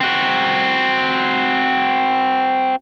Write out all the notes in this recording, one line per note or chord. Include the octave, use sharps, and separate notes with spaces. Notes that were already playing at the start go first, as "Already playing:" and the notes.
C4 F#4